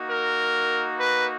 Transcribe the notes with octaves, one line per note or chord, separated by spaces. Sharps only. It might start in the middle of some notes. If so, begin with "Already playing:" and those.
Already playing: A#3 D#4 F#4
A#4
B4